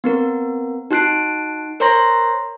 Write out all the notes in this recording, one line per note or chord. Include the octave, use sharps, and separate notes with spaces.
B3 C4 A#4
D#4 F#4 A5 F#6 C7 D7
A#4 C5 C#5 A#5 C6 A#6